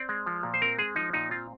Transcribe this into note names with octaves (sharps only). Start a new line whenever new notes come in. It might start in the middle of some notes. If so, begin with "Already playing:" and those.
Already playing: C4 D5
G#3
F3
A#2
C5
C4 A#4
G#3 G#4
F3 D#4
A#2 D#4
C4 F4